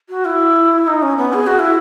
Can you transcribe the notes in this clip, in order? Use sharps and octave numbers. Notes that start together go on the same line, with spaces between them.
F#4
E4
D#4
C#4
B3
G#4
F#4
E4